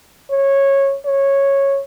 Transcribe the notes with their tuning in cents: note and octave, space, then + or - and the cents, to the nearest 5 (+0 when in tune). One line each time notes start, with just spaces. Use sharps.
C#5 -15
C#5 -10